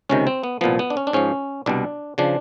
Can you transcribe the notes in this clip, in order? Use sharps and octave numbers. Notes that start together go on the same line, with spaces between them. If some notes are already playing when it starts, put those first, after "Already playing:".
C#2 C3 D#3 C#4
C4
B3
C2 A#2 F3 B3
B3
D4
C#4
D4
G#2 F3 C#4
C2 B2 G3 D4
C#3 F3 D4